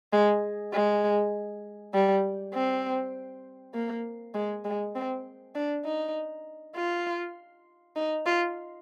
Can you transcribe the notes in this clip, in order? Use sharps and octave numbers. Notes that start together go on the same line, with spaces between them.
G#3
G#3
G3
C4
A#3
G#3
G#3
C4
D4
D#4
F4
D#4
F4